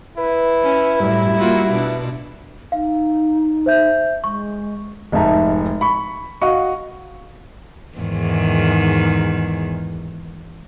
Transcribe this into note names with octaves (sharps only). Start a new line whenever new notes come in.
E4 B4
C#4
F#2 A2 G3
A#3 F4 F#4
B2 D4
D#4 F5
C5 E5 G6
G#3 C#6
F1 G#2 D#4 E5 A5 A#5
B5 C#6
F#4 D#5 F5 F#5 C#6
E2 G#2 D#3